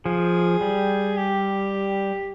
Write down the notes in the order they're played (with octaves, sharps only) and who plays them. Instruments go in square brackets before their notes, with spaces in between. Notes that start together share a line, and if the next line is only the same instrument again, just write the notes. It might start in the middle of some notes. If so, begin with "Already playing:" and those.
[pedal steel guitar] F3 [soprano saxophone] G#4
[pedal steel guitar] G3
[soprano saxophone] G4